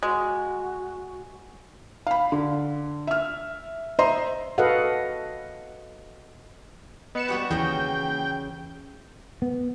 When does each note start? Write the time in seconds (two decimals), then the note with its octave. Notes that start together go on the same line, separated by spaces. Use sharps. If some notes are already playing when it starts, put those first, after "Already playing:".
0.03 G#3 F#4
2.07 F5 B5
2.32 D3
3.07 E5 F6
3.99 C5 D#5 E5 A#5 C6
4.58 F#4 A4 B4 D#5 F5 F#5
7.15 B3 D#5 C#7 E7
7.28 G3 F#4 G4
7.51 D#2 C#3 E3 G5 G#5 A#5
9.42 B3